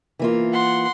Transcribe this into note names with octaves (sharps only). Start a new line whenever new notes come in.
E3 A#3 F4
F#5 C6